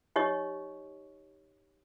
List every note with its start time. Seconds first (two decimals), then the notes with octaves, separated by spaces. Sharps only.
0.16 D#4 G4 C#5 D#5 C#6